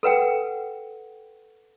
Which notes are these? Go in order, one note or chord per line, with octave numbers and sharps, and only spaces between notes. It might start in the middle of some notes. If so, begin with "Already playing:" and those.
A4 B4 F#5 G5